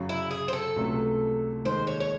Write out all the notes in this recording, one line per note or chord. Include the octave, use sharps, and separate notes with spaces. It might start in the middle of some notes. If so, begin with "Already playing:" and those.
Already playing: F#2 C#3 F#3
E4
G#4
C5
A4
C#2 C3 F#3 A3 C#4
D#2 D#3 G#3 C5
C#5
C#5